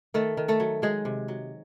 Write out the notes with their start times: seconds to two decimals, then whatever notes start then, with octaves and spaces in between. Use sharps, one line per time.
0.14 D#3 A3 A4
0.37 D#3
0.48 A3 A4
0.60 F#3
0.82 F#3 G#3 G#4
1.05 C3
1.28 F#3